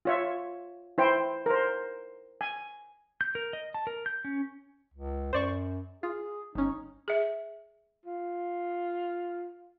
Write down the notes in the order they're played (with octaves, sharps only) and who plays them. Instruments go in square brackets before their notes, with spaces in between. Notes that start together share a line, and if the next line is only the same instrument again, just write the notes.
[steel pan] F4 C#5 E5
E4 C5 G5
A#4 C5
G#5
[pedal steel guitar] G6
A#4
D#5
A5
A#4
G6
C#4
[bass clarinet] C#2
[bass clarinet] F#2 [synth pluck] C5 D5 C#6
[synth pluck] F4 [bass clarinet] G#4
[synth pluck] G1 C#4 [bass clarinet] D#4
[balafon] G#4 E5
[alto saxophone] F4